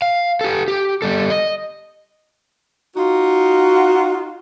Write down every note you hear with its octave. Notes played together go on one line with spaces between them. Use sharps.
F5
G4 A4
G4
G3 A4
D#5
D#4 F4 F#4